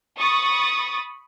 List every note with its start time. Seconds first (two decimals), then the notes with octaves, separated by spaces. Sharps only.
0.18 B5 C#6 D#6 A6